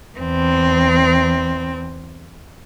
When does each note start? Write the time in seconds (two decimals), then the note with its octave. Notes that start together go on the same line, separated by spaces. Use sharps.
0.18 E2 C4